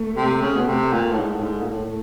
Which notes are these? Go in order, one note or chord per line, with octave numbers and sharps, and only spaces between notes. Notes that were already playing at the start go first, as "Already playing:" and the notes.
Already playing: A3
C3
C#3
B2
C3
A#2
A2
G#2
A2
G#2
A#2
A2